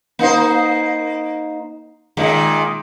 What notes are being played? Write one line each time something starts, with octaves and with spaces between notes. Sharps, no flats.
A#3 D#4 C5
A#2 D#3 G#3